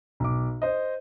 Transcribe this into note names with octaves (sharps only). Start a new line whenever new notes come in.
B1 D6
C5 D#5